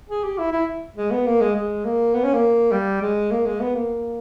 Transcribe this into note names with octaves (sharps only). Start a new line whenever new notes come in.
G#4
G4
E4
E4
G#3
B3
A#3
G#3
G#3
A#3
B3
C#4
A#3
G3
G#3
A#3
G#3
B3
A#3